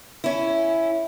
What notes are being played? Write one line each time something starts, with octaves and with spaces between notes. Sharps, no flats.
C#4 E4